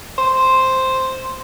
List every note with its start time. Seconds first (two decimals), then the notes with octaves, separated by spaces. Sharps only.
0.18 C5